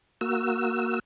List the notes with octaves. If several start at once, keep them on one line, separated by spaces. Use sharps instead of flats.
A#3 F#4 E6